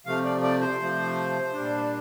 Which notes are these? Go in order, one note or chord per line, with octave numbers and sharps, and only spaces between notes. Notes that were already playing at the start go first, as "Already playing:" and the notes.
C3 F3 A3 F5
D5
D5
C5
C3 F3 A3
A#2 G3 D4